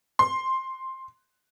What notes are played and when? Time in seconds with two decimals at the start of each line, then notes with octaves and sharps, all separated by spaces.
0.19 C6